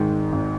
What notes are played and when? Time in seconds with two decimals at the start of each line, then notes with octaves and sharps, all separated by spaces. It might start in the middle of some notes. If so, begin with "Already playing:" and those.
Already playing: G#1 G#2 D#3 G#3
0.32 G#1